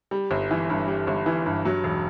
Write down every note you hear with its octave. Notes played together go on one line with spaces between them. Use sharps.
G3
G1
E3
G2
G3
G1
E3
G2
F#3
E1